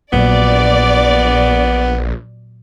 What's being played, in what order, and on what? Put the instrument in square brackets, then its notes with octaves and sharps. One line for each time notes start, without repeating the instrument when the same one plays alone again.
[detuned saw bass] A#1 [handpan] A#2 F#3 [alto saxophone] B3 [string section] D5